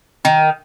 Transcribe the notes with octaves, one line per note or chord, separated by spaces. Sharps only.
D#3